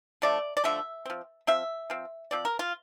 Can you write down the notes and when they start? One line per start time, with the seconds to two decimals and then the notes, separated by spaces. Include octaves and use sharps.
0.22 D3 F3 A3 D5
0.57 D5
0.64 D3 F3 A3 E5
1.06 F3 C4
1.47 F3 C4 E5
1.90 F3 C4
2.31 F3 C4 D5
2.45 A#4
2.59 F4